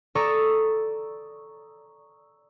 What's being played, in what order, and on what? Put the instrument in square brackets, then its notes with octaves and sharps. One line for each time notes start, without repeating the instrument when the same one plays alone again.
[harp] A4 D5 A#5 C#6 D#6 E6